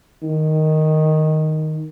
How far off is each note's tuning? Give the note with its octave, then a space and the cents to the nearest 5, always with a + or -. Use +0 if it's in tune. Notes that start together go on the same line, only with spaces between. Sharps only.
D#3 +0